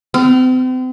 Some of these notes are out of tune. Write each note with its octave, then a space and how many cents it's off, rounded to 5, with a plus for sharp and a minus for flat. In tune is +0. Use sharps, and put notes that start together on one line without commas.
C4 -40